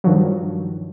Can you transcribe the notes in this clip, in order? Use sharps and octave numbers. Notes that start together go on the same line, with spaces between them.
G2 D#3 F3 F#3